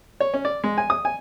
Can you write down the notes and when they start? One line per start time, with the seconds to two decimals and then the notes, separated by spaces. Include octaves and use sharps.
0.20 C#5
0.34 C#4
0.45 D5
0.64 G#3
0.78 G#5
0.90 D#6
1.05 G#5